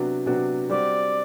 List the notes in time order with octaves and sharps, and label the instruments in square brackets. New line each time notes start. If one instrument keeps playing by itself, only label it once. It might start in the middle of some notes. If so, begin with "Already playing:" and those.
Already playing: [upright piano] C3 F#3 B3 D4 F#4
C3 F#3 B3 D4 F#4
[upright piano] G3 C4 F#4 [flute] D5